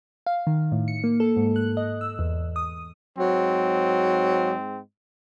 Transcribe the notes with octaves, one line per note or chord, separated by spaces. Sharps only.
F5
D#3
A2
C#7
A#3
A4
G#2
F#6
D#5
E6
E2
D#6
G#2 F#3 G#3 C4